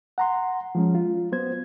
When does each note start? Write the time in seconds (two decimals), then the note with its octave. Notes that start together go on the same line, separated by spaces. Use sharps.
0.18 F#5 A#5 C6
0.75 F3 G#3 C#4
0.95 F4
1.32 F#3 B3 C5 G#6